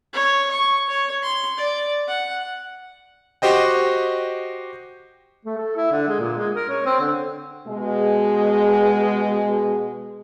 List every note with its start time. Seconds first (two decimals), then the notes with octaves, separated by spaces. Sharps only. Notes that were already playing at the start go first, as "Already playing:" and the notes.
0.13 C#5
0.51 C#6
0.89 C#5
1.23 C6
1.57 D5
2.08 F#5
3.42 F#4 G4 C5 D#5 G5
5.45 A3
5.58 A4
5.76 E4
5.92 D3
6.08 G#3
6.19 A#2
6.37 G#3
6.56 A#4
6.69 C#4
6.86 C4
7.00 D3
7.68 B2 G#3